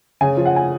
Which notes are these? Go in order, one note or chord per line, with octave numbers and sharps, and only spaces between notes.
C#3 G#5
F3
F#5
G#5